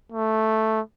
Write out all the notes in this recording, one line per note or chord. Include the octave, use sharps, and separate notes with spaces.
A3